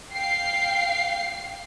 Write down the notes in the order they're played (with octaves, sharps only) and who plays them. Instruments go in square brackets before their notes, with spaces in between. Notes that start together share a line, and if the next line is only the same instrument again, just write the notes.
[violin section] F5 G5 C7